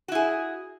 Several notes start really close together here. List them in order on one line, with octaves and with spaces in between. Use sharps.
F#4 E4 G#4